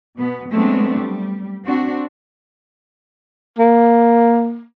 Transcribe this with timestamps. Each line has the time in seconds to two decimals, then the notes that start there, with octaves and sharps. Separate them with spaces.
0.16 B2 B3
0.49 F#3 G#3 A3 B3 C4 D4
0.90 G3
1.64 C4 D4 F#4
3.59 A#3